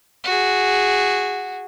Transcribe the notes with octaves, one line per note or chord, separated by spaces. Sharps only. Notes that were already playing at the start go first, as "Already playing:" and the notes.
F#4 G#4